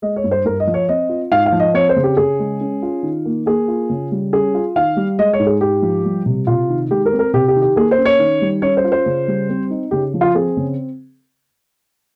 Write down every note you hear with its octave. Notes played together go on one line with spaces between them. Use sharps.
G#3 D#5
C#5
G2
C5
G2 A#4
D#5
F3
C#5
C4 D#5
F4
G#2 F5
F5
F3
D#5
C4 C#5
C5
C#3
G4
C#3 G#4
G#3
C#4
F4
D#3
A#3
A#3 G#4
F4
C#3
G3
C#4 G#4
F4
D#3 F5
G3
G#3 D#5
C#5
G#2
G#4
G#2 G4
F3
G3
C3
C3 F4
D#3
G#3 G4
A#4
C4
A#4
C3 G4
G4
D#3
G4
A#3 G#4
C5
C#4
C#5
D#3
G3
C#4 C#5
C5
F4
C5
C#3
G3
C4
D#4
C#3 G4
F3
F4
C4 G#4
C#3